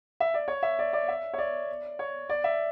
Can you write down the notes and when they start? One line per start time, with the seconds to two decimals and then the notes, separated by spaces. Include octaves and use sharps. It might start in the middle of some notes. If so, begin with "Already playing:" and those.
0.20 E5
0.34 D5
0.48 C#5
0.63 E5
0.79 D5
0.93 D5
1.08 E5
1.34 C#5
1.38 D5
1.99 C#5
2.29 D5
2.44 E5